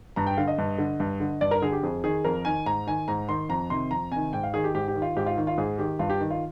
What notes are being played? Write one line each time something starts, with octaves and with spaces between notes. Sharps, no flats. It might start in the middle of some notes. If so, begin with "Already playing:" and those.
G2 A#5
G5
D3 F5
D#5
G2
D3
G2
D3
G2 D5
A#4
D3 G#4
G4
F2 G#4
D#3 G#4
F2 A#4
D#3 G#5
G#2 A#5
D#3 G#5
G#2 A#5
D#3 C6
F2 A#5
C3 D#3 C6
F2 A#5
C3 D#3 G#5
G#2 G5
F5
D#3 G#4
G4
G#2 G4
G4
D#3
F4
G#2 G4
F4
D#3
F4
G#2 G#4
D#3 G4
G2 F4
G4
D#3
F4